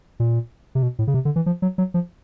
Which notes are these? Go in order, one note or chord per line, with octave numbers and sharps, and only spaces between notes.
A#2
C3
B2
A2
C#3
C3
D3
E3
F3
F#3
F#3
F3